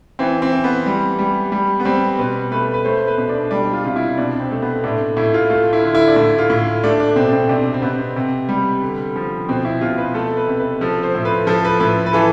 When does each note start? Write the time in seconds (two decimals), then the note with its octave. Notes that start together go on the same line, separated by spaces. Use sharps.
0.19 E3 C4
0.42 C4
0.52 E3
0.64 B3
0.86 G3
1.19 G3
1.52 G3
1.80 B3
1.85 G3 C4
2.19 B2 B4
2.52 A3 B4
2.74 B4
2.85 A3 C5
2.97 C5
3.07 B4
3.18 B2
3.29 D4
3.51 G3 D4
3.73 F4
3.84 C3 F4
3.96 E4
4.18 B2 D4
4.40 C4
4.51 A3
4.62 B3
4.84 A2 D4
5.17 A2 E4
5.34 F4
5.50 A3 F4
5.73 E4
5.84 D3
5.95 E4
6.08 D4
6.16 A2 E4
6.38 F4
6.50 A2
6.84 A3 D4
7.00 D4
7.11 D4
7.16 B2 C4
7.33 C4
7.49 C3 D4
7.74 C4
7.82 C3 B3
8.16 C3
8.49 G3
8.82 D3
9.16 F3
9.49 B2 C4
9.65 E4
9.81 B2 F4
9.98 B4
10.14 A3 A4
10.37 B4
10.48 C3
10.59 B4
10.81 F3 A4
11.03 C5
11.15 A2
11.25 B4
11.47 F3 A4
11.65 B4
11.80 A2 B4
12.06 B4
12.13 E3 A4